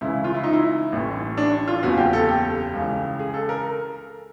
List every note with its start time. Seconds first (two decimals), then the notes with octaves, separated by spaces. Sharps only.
0.01 C#2 C#3 E3 E4
0.24 F4
0.34 E4
0.44 D#4
0.53 E4
0.92 A1 A2 E3
1.37 D4
1.68 F4
1.82 F#1 E2 C#3 F#4
1.97 G4
2.13 A4
2.29 G4
2.74 C#2 C#3 E3
3.19 G#4
3.34 A4
3.49 A#4